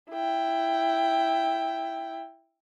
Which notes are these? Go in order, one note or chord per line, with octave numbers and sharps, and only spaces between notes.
E4 G5